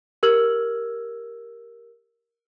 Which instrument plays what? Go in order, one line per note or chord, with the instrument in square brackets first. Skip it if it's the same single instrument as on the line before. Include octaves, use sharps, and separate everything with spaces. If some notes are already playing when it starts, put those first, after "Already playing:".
[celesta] G4 A#4 E6 F6 G#6 F#7